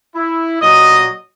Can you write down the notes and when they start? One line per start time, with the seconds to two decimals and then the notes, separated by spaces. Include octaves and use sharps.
0.15 E4
0.60 A#2 F#3 D#5